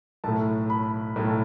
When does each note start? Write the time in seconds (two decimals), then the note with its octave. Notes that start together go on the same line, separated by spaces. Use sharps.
0.24 B1 A2 A3 A5
0.70 B5
1.16 B1 A2 A3